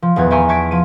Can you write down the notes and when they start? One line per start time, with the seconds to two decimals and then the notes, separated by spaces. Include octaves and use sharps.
0.02 F3
0.16 D#1 E2 B3 G#6
0.30 D5 E5 G5 G#5 A#5 C#6
0.48 E5 A5 C#6 G#6 B6 D7
0.71 F3 D#7